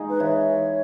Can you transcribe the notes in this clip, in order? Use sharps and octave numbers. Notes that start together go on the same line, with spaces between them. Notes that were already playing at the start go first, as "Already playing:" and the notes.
Already playing: G#3 D#4 G#4
B4
E3 C#5